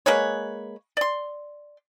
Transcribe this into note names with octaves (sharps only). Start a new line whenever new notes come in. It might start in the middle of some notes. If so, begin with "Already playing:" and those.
G#3 A#3 B4 C#5
D5 C6